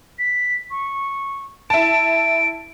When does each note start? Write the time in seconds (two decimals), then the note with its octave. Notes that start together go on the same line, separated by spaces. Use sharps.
0.19 B6
0.71 C#6
1.70 E4 A5 D7